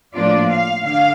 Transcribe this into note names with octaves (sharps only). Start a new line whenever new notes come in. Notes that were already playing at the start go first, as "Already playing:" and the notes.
A2 F3 A#3 D4 F4 D5
F5
D3 F5